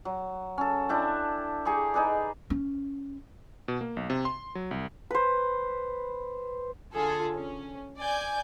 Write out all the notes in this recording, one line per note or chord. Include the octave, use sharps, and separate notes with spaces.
F#3
C#4 A4
D4 E4 G5
G4 G#4 A#5 C#6
D#4 G#4 B4 D5
C#4
B2
A#3
B1
C3
C6
F#3
C2
B4 C5
D3 F4 G#4 A4
C#4
D5 G#5 G6